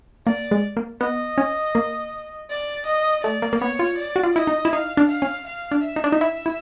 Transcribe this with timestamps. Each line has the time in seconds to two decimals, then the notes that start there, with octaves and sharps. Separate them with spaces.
0.27 A#3 D5
0.51 G#3
0.77 A#3
1.01 B3 D#5
1.38 C#4
1.75 A#3
2.49 D5
2.86 D#5
3.24 A3 D5
3.42 A#3
3.53 A#3
3.61 B3 C#5
3.79 F4
3.98 D5
4.16 F#4
4.23 F4
4.35 E4 D#5
4.47 D#4
4.65 E4
4.73 D#4 F5
4.97 D4
5.09 F5
5.22 C#4
5.47 F5
5.71 D4
5.84 E5
5.96 D#4
6.04 D4
6.12 D#4
6.21 E4
6.46 E4